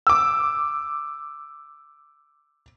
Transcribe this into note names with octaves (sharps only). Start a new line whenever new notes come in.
D6 E6